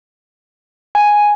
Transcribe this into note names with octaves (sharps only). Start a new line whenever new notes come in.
G#5